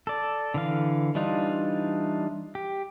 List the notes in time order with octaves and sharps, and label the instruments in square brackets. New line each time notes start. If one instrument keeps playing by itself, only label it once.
[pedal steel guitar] A4 D5
D3 E3 F5
E3 G3 D4 D#4 F4
G4